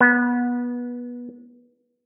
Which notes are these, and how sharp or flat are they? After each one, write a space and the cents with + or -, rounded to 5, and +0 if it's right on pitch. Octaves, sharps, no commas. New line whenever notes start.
B3 -20